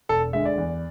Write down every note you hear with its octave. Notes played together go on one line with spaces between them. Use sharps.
E1 A4
D2 D3 G#3 E5
D5
E2